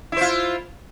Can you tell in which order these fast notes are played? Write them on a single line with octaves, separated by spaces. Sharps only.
E4 C5 F4